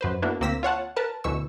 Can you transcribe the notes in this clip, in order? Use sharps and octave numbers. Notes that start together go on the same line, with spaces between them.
F#2 B4 C5
A#3 B3 D4 E4 F#4 B4
D2 A#3 C4 E6 A#6 B6
F4 C#5 F#5 A5
A#4 B4 A5
D2 B2 E3 C#6 E6